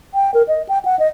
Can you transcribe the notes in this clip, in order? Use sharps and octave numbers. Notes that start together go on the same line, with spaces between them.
G5
A#4
D#5
G5
F#5
D#5